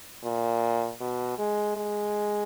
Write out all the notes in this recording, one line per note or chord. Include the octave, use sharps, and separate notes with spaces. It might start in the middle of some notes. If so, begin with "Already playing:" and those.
A#2
B2
G#3
G#3